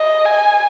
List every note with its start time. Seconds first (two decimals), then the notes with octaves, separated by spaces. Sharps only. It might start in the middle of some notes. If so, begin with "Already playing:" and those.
Already playing: D#5
0.25 G#5